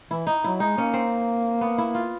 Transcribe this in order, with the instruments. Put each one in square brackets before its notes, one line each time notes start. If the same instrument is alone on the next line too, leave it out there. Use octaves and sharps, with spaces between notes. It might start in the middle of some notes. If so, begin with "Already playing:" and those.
[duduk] E3 [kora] E4
[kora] D#4
[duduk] F#3 [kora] E4
[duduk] G#3 [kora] D#4
[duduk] A#3 [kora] C#4
[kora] C4
B3
E4
F4